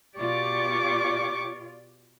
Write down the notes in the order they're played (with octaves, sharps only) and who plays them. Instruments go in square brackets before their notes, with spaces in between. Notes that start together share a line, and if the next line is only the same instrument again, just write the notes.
[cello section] B2 F4 D5 [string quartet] G4 C#6 D6